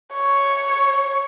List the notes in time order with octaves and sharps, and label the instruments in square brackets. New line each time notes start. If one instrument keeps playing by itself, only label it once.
[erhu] C#5